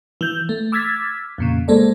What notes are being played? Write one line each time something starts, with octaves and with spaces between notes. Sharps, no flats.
E3 G6
A3
D6 E6 F6 G#6 A6 B6
F2 A#2 C#3
G#3 A#3 A4 C5 D5